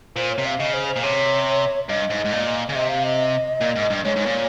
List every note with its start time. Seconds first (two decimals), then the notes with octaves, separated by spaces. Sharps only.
0.16 A#2 C5
0.31 C#5
0.38 C3
0.46 F5
0.60 C#3 D#5
0.74 C5
0.88 C5
0.96 A#2
1.03 C3 C#5
1.89 G2 D#5
2.10 G#2
2.25 G#2
2.32 A#2
2.69 C#3
2.75 C3 D#5
2.89 F5
3.04 D#5
3.61 A#2
3.75 G#2
3.90 G2
4.04 G#2 C#5
4.16 G#2
4.26 A#2